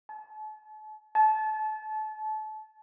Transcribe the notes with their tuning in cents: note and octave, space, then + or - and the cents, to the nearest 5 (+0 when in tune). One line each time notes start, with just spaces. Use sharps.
A5 -40
A5 -30